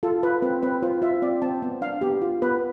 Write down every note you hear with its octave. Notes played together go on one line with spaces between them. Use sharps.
F4 A4
F4 B4
C4 B4
C4 B4
F4 C5
F4 E5
C4 D5
C4 A5
B3
D4 F5
B3 G4
F4
B3 B4